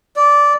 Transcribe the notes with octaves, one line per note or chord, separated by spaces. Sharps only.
D5